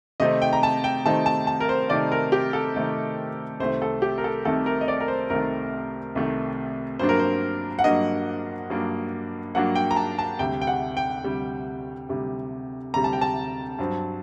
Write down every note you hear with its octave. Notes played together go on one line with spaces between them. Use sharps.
C3 D#3 A3 C4 D#4 D#5
G5
A#5
A5
G5
C3 D#3 A3 C4 D#4 A5
A5
A5
A#4
C5
C3 D#3 A3 C4 D#4 D5
A#4
G4
A4
C3 D#3 A3 C4 D#4
C2 C3 D#3 A3 C5
A4
G4
A#4
A4
C2 C3 D#3 A3 A4
A#4
D#5
D5
A#4
C5
C2 C3 D#3 A3 A#4
C2 C3 D#3 A3
G2 F#3 A#3 D4 C5
A#4
C5
F#5
G2 F#3 A#3 D4 D#5
G2 F#3 A#3 D4
G2 F#3 A#3 D4 F#5
G5
A#5
A5
A5
D2 C3 G3 G5
G5
F#5
G5
D2 C3 G3
D2 C3 G3
D2 C3 G3 A#5
A5
G5
A5
G2 F#3 C4